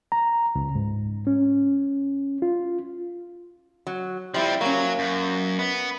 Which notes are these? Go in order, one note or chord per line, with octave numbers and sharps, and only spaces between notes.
A#5
C#2
G#2
C#4
F4
F#3
F3 G3 C4 E4
F#3 A#3 C#4
F#2
B3